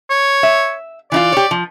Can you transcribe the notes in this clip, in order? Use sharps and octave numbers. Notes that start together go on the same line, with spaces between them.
C#5
E5
E3 D#4 F4 D5
G4 C#5
F3